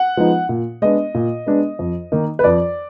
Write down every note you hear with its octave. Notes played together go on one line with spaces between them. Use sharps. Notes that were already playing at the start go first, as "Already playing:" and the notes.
Already playing: F#5
F3 G#3 B3 D#4
A#2
G#3 B3 D4 D#5
A#2
G#3 B3 D4
F2
D#3 A#3 D#4
B4
F2 D5